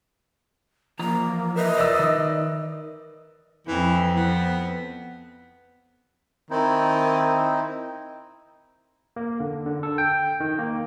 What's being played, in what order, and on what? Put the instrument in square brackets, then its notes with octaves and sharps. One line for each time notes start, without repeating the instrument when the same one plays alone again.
[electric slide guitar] E3 F3 A#5 [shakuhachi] A#3
[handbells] A#4 B4 E5 [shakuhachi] D#5
[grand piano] D5 E6
[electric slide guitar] D#3
[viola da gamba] F2 C4 [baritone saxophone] E3
[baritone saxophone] B3
[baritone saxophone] D#3 [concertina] C4 D#4 E4
[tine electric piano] A#3
D3
D3
A4
G5
D#3
A#3